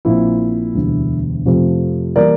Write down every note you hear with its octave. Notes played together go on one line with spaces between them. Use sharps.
A#1 A#2 F3 C4 E4
E1 D2 D3 G3
F2 C3 F3 A3 C4
E3 G3 A#3 A#4 D5